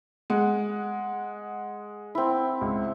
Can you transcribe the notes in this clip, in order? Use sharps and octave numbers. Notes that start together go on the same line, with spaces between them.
G#3 F#5
C4 E4
C#2